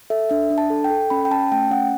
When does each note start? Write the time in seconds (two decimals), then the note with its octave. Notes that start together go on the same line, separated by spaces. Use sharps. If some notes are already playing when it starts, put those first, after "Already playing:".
0.10 A4 E5
0.30 D4 E5
0.50 D4
0.58 A5
0.70 A4
0.84 G5
0.90 A4
1.10 C#4 B5
1.25 G5
1.31 C#4 A5
1.52 A3 G5
1.71 C#4 F#5